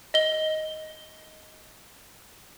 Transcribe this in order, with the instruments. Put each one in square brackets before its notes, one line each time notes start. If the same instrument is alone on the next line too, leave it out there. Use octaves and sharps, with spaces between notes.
[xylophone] D#5 G7